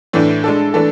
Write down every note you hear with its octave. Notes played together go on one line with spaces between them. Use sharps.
A2 E3 A3 D4
G#3 D4 A4
E3 A3 D4 A4